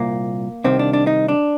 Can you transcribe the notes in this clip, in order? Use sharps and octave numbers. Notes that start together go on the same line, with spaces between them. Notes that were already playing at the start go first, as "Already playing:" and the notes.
Already playing: C2 A#2 A#3
C2 C3 D#3 C4
D4
D4
D#4
D4